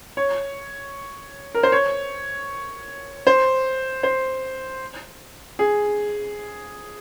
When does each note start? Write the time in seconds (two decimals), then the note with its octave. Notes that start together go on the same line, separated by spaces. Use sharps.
0.17 C#5
1.55 A#4
1.63 C5
1.72 C#5
3.27 C5
4.03 C5
5.59 G#4